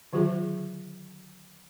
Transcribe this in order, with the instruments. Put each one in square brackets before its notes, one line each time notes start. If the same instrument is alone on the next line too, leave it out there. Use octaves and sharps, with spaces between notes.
[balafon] D3 D#3 F#3 F4 G#4